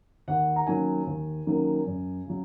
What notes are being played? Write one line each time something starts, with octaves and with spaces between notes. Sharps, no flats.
D#2 F#5
A#5
D#3 F#3 A#3 C#4 G#5
D#2
D#3 F#3 A#3 C#4
F#2
C#3 F#3